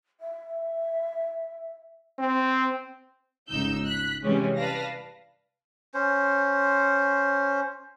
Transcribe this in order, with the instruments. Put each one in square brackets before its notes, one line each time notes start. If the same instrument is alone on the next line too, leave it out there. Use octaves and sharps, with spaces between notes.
[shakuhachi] E5
[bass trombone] C4
[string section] G1 C#2 G#2 D#4 E6 G6
F#6 B6
C3 E3 G3 G#3 C#4
B4 D5 F5 A5 A#6
[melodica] C#4 C5